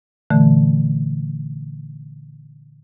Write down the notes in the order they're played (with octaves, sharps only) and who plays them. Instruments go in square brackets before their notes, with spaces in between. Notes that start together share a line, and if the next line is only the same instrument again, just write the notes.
[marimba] A#2 D3 E3 A3